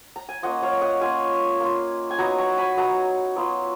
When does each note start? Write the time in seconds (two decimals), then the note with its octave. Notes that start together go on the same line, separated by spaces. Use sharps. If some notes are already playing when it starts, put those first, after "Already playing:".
0.16 A#5
0.29 G#5
0.43 A#3 C#4 F4 D#5 F#5
0.63 C#5 F5
0.81 D#5 F#5
1.01 A#3 C#4 F4 F5 G#5
1.60 A#3 F4
2.11 G#5
2.18 F#3 B3 D#4 F#5 A#5
2.38 A#5 C#6
2.57 G#5 B5
2.77 F#3 B3 D#4 F#5 A#5
3.36 F#3 B3 F4